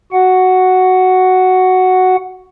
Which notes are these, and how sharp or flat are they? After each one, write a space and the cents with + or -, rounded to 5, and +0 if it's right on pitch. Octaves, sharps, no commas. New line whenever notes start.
F#4 +5 F#5 +0